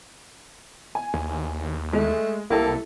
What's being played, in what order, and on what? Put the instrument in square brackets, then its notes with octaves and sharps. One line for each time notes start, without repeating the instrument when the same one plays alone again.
[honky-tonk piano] G#5
[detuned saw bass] D#2
[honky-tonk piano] G#3 [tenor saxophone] A3
[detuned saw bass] C2 [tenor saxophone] A#3 [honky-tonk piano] E4 G4 A4